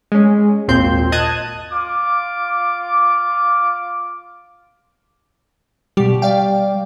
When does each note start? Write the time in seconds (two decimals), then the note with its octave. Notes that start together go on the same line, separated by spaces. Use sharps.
0.12 G#3 C#4
0.68 G#1 D#2 A#2 C4 C6 G6
1.12 D#5 A5 D#6 F#6 G#6 D#7
1.72 F4 D6
5.97 B2 G3 G4
6.22 D5 F5 G5